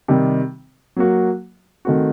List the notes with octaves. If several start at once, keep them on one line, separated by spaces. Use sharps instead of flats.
C3 D#3 G3
F#3 A#3 F#4
D#3 A3 C4 F#4